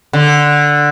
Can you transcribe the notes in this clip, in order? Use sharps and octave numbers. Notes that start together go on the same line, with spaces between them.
D3